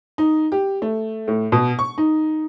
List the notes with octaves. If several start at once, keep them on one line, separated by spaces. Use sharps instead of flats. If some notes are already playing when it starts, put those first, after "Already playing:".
D#4
G4
A3
A2
B2
C#6
D#4